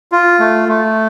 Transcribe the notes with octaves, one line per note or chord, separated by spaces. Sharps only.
F4
A3
A3